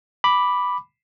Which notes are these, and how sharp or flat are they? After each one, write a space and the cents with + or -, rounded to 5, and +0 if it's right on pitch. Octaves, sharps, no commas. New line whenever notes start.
B5 +0 D6 +0